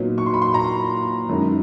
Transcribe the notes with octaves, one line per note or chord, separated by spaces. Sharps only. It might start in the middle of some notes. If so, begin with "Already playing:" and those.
Already playing: A#2 F#3 B3 D#4
C#6
C6
B5
C6
A#5
F#2 D#3 G#3